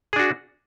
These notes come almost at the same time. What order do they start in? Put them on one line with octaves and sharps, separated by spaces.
G#4 D4 F#4